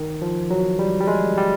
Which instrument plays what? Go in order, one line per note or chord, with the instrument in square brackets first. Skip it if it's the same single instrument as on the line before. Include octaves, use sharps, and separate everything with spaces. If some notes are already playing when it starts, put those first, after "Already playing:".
Already playing: [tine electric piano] D#3
F3
F#3
G3
G3
G#3
G3